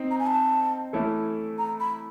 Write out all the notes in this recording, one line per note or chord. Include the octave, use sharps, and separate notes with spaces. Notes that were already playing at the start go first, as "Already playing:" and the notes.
Already playing: C4 D#4
A#5
G#5
A5
E3 A3 C#4 E4 A4
A#5
B5